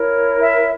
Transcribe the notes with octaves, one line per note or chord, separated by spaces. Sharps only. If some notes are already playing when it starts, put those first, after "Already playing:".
Already playing: E4 A#4 C#5
E5